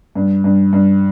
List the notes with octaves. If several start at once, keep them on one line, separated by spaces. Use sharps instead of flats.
G2
G2
G2